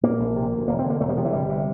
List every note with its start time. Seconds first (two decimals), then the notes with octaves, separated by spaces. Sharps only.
0.03 A#2 A#3
0.20 A#1
0.36 C3
0.52 D2
0.68 E1 A#3
0.79 C4
0.84 D3
0.90 A#3
1.01 E1 A3
1.09 G3
1.17 C3 F3
1.25 E3
1.33 G1 G3
1.49 C3